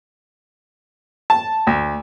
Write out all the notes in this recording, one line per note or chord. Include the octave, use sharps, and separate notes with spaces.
A5
D2